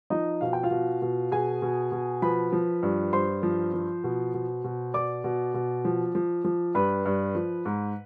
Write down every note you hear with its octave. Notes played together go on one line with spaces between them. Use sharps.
F3 D#4 D#5
B2 F5
G5
F4 F5
B2
B2
B2 G#4 G#5
B2
B2
F3 B4 B5
F3
G2
G2 C5 C6
F3
F3
B2
B2
B2
B2 D5 D6
B2
B2
F3
F3
F3
G2 B4 B5
G2
F3
G#2